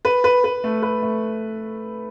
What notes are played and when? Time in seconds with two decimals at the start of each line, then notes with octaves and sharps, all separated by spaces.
0.05 B4
0.24 B4
0.44 B4
0.64 A3
0.82 B4
1.02 A3